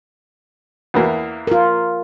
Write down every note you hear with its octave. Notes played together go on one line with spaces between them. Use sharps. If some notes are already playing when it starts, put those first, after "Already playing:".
E2 E3 A#3
F4 A#4